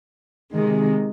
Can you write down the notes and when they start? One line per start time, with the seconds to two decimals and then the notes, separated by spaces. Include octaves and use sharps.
0.53 C3 D#3 G#3